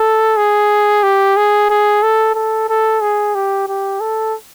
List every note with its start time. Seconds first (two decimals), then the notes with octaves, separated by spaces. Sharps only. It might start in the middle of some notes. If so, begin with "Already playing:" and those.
Already playing: A4
0.37 G#4
1.03 G4
1.37 G#4
1.70 G#4
2.03 A4
2.35 A4
2.69 A4
3.01 G#4
3.35 G4
3.68 G4
4.00 A4